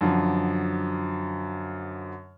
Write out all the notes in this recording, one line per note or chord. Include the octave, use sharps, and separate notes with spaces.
F#2 D3 F3